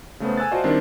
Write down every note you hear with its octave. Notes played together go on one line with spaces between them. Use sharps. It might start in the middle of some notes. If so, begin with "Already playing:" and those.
C#3 A3 B3 C5
G#5 E6 F#6 A6
F4 F#4 C5 D5 D#5 A5
D#3 G3 C4 D4 E4